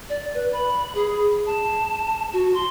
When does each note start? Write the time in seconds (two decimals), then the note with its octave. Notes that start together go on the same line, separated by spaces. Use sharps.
0.09 D5
0.34 B4
0.53 B5
0.95 G#4
1.46 A5
2.33 F#4
2.54 C6